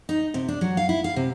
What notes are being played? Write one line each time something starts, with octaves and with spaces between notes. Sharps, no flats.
D#4
C3
D4
F#3
F5
E4
F5
C3